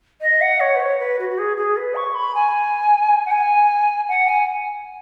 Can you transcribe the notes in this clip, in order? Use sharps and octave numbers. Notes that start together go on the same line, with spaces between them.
D#5
F#5
C#5
B4
C#5
B4
F#4
F#4
G#4
G#4
B4
C#6
B5
G#5
F#5
G#5
F#5
G#5